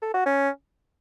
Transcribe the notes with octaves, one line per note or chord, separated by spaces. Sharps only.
A4
F#4
C#4